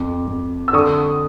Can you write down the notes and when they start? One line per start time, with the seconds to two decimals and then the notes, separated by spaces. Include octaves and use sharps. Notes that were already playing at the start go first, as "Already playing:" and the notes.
Already playing: F2 D6
0.27 F2
0.68 E6
0.73 D3 C#6 D#6